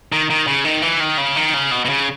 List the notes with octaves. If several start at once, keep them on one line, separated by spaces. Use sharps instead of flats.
D#3
D#3
C#3
D#3
E3
D#3
C#3
D#3
C#3
B2
B2
C#3